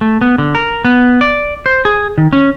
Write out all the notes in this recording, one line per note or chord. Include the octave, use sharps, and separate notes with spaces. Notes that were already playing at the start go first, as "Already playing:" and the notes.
A3
B3
D3
A#4
B3
D5
C5
G#4
D#3
C#4